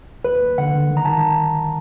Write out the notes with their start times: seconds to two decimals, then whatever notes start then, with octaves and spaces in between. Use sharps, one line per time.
0.24 D#2 B4
0.41 D#2
0.58 D3 F#5
0.74 D3
0.91 D#3
0.97 A#5
1.05 D#3 A5